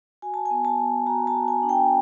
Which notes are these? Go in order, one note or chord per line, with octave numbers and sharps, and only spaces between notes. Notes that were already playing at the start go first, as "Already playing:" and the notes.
F#4 G#5
A5
G#5
B3
A5
B3
F#4 A#5
A5
F#4
G#5
D4
G5